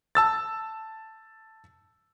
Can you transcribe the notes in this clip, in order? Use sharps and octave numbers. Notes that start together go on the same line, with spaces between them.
A5 E6 A6